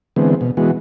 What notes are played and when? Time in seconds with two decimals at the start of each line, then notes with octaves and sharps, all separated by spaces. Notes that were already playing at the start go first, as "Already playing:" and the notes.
0.16 D3 E3 G#3 B3 C4
0.41 B2
0.57 E3 G#3 B3 F#4